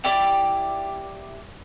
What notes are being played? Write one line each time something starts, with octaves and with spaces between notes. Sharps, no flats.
E4 G4 D5